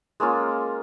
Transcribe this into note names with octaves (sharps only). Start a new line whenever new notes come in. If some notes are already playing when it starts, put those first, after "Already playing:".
G#3 A#3 C#4 F4